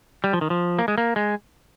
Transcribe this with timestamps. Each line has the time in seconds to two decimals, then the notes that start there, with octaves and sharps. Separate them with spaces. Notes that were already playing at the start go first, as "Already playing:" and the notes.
0.24 G3
0.33 F3
0.41 D#3
0.50 F3
0.79 A#3
0.88 G#3
0.98 A#3
1.16 G#3